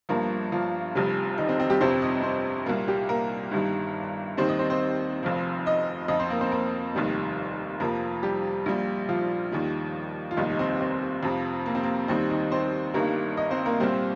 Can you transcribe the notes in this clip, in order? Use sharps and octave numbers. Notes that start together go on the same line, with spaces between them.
G1 G2 F3 A#3 A#4
F3 F4
F1 F2 C3 G3
D#3 D#4
C4
C4
G3 G4
G1 F2 C3 G3 C4 C5
D#4 D#5
C4 C5
C2 A#2 G3 A#3 A#4
G3 G4
A#3 A#4
G1 G2 D#3 G3
D#2 D#3 G3 C4 C5
D#4 D#5
C4 C5
C4 C5
F1 F2 F3
D#4 D#5
F2 F3 D#4 D#5
C4 C5
A#3 A#4
C4 C5
A#3 A#4
F1 D#2 D#3 G3
F2 C3 F3 A#3 A#4
G3 G4
A#1 A#2 G3
F3 F4
D#2 D#3 G3
F4
F1 D#2 D#3 G3 D#4
D#4
C4
C4
F2 C3 F3
A#3
C4
A#3
D#2 D#3 G3 C4
D#3 D#4
C4 C5
G1 G2 D#3 G3 A#3 A#4
D#4 D#5
C4 C5
A#3 A#4
C2 A#2 G3 C4 C5